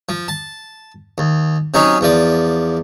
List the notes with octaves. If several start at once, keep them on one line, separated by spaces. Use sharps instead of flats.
F3
A5
D#2
C3 F#3 C#4 D#4
E2 F3 D5